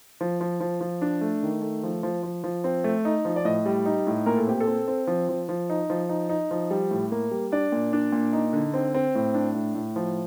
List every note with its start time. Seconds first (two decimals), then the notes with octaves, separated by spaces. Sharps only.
0.21 F3
0.41 F3
0.60 F3
0.81 F3
1.02 D4
1.21 A3
1.43 D#3
1.62 A3
1.83 F3
2.03 F3
2.23 F3
2.44 F3
2.64 C4
2.84 A3
3.05 D#4
3.25 F3
3.36 D5
3.45 A2 D#5
3.66 G3
3.86 D#4
4.07 A2
4.26 A#2 A#4
4.37 A4
4.47 C4 G4
4.60 A4
4.67 C4
4.88 C4
5.07 F3
5.29 F3
5.49 F3
5.70 D#4
5.90 F3
6.09 D#4
6.29 D#4
6.51 F3
6.71 G3
6.91 A2
7.12 A#3
7.31 G3
7.52 D4 D5
7.72 A#2
7.93 D4
8.12 A#2
8.33 D#4
8.53 D3
8.74 C4
8.94 C4
9.15 A2
9.34 D4
9.55 A2
9.75 A2
9.96 F3